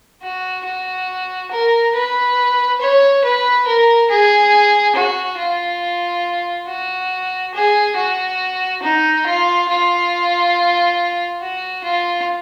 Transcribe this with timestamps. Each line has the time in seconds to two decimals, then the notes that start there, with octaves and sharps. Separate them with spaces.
0.23 F#4
0.65 F#4
1.51 A#4
1.95 B4
2.81 C#5
3.24 B4
3.67 A#4
4.10 G#4
4.95 F#4
5.38 F4
6.67 F#4
7.54 G#4
7.96 F#4
8.82 D#4
9.26 F4
9.69 F4
11.41 F#4
11.84 F4